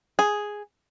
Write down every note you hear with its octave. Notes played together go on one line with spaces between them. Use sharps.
G#4